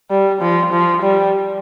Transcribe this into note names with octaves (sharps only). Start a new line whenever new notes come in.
G3
F3
F3
G3